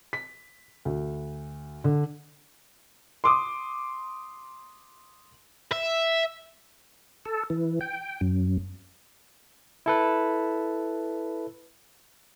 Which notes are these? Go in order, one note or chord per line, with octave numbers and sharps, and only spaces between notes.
B6
D2
D3
C6 D6 D#6
E5
A4
E3
G5
F#2
E4 A4 B4